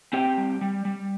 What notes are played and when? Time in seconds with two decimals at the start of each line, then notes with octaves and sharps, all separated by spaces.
0.13 C4 G4 G5
0.38 G3
0.61 G3
0.85 G3